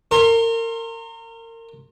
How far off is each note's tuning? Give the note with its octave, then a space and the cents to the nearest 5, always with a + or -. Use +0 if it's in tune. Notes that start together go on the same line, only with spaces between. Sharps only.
A#4 -30 C6 +25